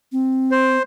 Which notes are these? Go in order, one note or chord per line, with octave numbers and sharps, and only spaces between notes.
C4
C5